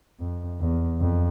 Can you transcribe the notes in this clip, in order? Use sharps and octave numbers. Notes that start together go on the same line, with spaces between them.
F2
E2
F2